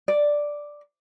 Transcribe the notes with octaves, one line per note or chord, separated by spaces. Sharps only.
D5